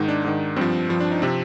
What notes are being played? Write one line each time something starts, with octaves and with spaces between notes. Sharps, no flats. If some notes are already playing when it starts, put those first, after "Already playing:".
Already playing: G#2 D#3 D#4
D4
G#2 D#3
G2 F3 C4
G2 F3
D4
D#4
C3 F3 C4